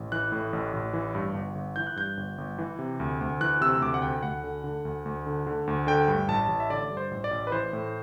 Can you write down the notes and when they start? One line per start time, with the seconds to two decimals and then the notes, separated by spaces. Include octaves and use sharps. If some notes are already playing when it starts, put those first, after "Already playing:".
Already playing: A1
0.12 E3 F#6
0.32 A2
0.53 A1
0.73 A1
0.93 E3
1.15 G2
1.34 G1
1.55 G1
1.76 E3 G6
1.87 F#6
1.96 G2 G6
2.17 G1
2.38 G1
2.58 E3
2.79 C3
3.00 D2
3.21 D2
3.41 E3 F#6
3.61 C3 E6
3.81 D2 D6
3.94 F#5
4.02 D2 G5
4.23 D2 F#5
4.44 D3
4.64 D3
4.85 D2
5.06 D2
5.26 D3
5.47 D3
5.67 D2
5.87 D3 G5
6.08 G2
6.28 A1 A5
6.49 A1
6.60 E5
6.70 D3 D5
6.90 G2
6.97 C5
7.11 A1
7.24 D5
7.31 A1
7.47 B4
7.52 E3 C5
7.73 A2